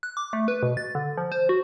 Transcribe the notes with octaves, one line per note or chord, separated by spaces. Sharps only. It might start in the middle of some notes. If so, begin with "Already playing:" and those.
F#6
D6
A3
B4
B2
A6
D3
F3
C5
F#4